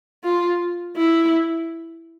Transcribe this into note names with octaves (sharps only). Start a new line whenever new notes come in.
F4
E4